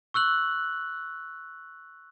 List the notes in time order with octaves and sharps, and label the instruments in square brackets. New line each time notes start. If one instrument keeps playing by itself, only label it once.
[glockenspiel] C#6 E6 F#6 F#7